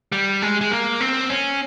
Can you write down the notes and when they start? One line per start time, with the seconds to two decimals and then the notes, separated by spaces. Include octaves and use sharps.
0.12 G3
0.42 G#3
0.61 G#3
0.71 A#3
1.01 C4
1.30 C#4